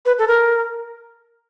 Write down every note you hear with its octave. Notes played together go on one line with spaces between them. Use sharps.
B4
A4
A#4